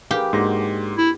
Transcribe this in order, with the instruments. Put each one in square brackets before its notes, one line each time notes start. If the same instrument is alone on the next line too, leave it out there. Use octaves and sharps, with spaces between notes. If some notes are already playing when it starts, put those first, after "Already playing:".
[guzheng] G4 [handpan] G#4 A#4 B4 [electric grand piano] F5 G5
[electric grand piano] G#2 C6 A#6 [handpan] A#3 D4 F#4
[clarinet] E4